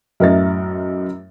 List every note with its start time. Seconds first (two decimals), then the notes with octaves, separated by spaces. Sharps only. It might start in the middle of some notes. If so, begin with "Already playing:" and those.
0.20 F#2 A2 A#4 D#5 E5 A6